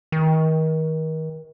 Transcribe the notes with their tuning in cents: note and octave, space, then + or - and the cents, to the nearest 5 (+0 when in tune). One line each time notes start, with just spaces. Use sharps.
D#3 +35